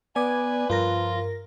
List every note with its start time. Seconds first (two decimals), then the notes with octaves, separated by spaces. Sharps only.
0.16 B3 B4 D5 G#5 D6 G#6
0.70 G2 F3 F4 A#4 A#6